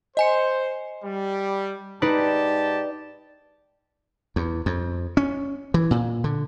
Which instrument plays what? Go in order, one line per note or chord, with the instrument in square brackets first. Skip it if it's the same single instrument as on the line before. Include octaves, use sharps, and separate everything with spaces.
[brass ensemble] C5 [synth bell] D#5 G#5 C#7
[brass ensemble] G3
[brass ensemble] G#2 G4 A5 [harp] D#4 B4 D5
[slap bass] E2
F2
C#4
E3
A#2
D3